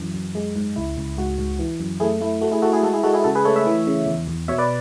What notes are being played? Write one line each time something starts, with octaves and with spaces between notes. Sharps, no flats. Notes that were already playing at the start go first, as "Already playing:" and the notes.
Already playing: F#2 E3
F#2
G#3
G#2
C#2 E4
C#2
G#2 F#4
G#2
E3
F#2
A3 E4 G#4
A3 E4
A3 F#4
E4 G#4
A3 F#4 A4
E4 G#4
G#3 F#4 A4
E4 G#4
G#3 F#4 A4
E4 G#4
C#3 F#4 A4
G#4 B4
A3 A4 C#5
C#5 E5
E3
C#3
E2
E2
B2 C#5 E5
B4 D5